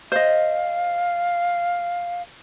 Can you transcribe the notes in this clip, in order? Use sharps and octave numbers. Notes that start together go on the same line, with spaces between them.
C5 D#5 F5